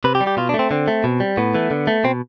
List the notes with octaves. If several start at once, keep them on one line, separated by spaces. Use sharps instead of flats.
C3 B4
G4
G3
G4
B2 F4
D4
A3
C4
D3 C4
A3
B2
G3
A2 B3
E3 A3
D3
A3
B2 C4